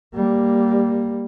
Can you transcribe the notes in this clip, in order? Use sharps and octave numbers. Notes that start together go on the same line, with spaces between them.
G3 A#3